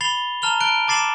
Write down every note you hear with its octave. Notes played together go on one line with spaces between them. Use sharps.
B5 A6 C7 F7 G7
A5 A#5 F6 F7 G7
A5 F#6 D7 G7
A5 D6 A6 C7 E7 F#7